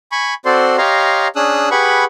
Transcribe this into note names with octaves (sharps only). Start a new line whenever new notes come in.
G#5 B5 C#6
C4 F#4 A4 C5 D5 C6
G4 C#5 D#5 F5 A#5 C6
C#4 D4 G#4 D#6 E6 F#6
G4 G#4 B4 F#5 B5 C#6